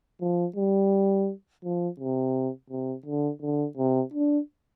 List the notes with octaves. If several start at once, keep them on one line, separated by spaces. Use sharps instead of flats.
F3
G3
F3
C3
C3
D3
D3
C3
D4